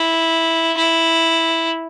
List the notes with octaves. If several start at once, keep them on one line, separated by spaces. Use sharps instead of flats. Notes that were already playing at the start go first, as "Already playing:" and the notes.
Already playing: E4
E4